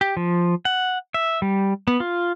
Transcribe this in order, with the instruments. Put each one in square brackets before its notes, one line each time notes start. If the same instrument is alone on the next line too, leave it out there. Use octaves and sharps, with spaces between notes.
[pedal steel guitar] G4
F3
F#5
E5
G3
B3
F4